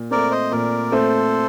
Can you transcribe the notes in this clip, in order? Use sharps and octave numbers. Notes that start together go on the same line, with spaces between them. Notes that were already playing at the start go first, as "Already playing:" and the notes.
Already playing: A#2
A3 C4 A#4 D5
C5 D#5
A#2 A#4 D5
A3 C4 A4 C5